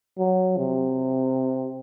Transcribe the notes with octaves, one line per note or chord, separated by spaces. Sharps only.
F#3
C3